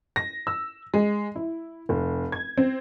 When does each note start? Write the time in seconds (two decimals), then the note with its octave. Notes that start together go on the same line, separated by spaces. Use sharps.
0.16 A#6
0.47 E6
0.94 G#3
1.36 E4
1.89 F1
2.32 G#6
2.57 C4